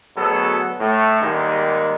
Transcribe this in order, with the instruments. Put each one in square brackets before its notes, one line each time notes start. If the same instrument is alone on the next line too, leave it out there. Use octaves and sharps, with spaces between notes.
[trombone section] D2 B2 F#3 B3 G#4 A4
A2 A3
D#2 G#2 D#3 G3 G#3 D#4